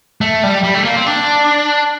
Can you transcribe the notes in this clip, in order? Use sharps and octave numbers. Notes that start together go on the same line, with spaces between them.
A3
G3
G3
A3
A#3
C4
D4